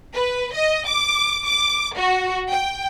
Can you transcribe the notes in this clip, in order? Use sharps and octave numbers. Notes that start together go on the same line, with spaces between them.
B4
D#5
D6
D6
F#4
G5